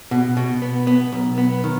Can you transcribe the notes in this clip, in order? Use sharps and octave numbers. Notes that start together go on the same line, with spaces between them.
B2
B2
B3
B3
B1
B3
D#3